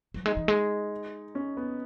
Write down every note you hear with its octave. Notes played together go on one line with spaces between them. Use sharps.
F#3
G#3 D#4
E3
G#3
C#4
B3